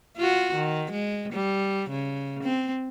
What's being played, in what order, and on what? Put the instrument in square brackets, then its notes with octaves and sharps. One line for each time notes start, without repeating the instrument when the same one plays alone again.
[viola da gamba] F4 F#4
D#3
G#3
G3
C#3
C4